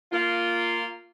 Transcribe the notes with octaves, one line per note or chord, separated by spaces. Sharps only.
A#3 F4